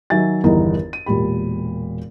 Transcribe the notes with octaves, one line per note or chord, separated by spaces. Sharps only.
D#3 F#3 E5 G#5 A6
G1 E2 D#3 D#4 E4 A#4
D#7
E1 A#2 G4 B5